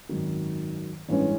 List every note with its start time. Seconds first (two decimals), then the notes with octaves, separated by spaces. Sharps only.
0.09 G#1 F#2 D#3 F#3
1.09 A1 G2 E3 G#3 C#4